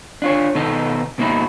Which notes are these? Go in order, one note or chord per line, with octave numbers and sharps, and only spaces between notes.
D4 F4 C#5
B2 D#3 B3 D#4 A4
B2 A#3 D#4 E4 F#4